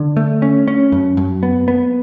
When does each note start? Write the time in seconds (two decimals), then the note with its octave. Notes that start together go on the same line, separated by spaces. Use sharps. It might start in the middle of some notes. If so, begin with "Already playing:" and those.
Already playing: D3
0.17 A3
0.42 C#4
0.68 C#4
0.92 F#2
1.17 F#2
1.43 B3
1.68 B3